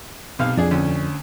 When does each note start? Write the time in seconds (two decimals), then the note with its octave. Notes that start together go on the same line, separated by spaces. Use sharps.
0.39 B1 C3 F5
0.57 F2 D4 G#4
0.71 D2 C#4